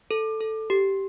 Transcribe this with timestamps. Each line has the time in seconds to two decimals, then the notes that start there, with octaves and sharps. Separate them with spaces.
0.11 A4
0.40 A4
0.70 G4